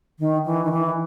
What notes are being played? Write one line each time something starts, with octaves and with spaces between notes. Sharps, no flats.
D#3
E3
D#3
E3